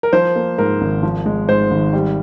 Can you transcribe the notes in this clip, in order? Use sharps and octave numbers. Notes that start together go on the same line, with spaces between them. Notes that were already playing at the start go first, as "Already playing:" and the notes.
A#4
F3 C5
A#3
G#2 A#4
G#1
F3
G#3
G#2 C5
G#1
G3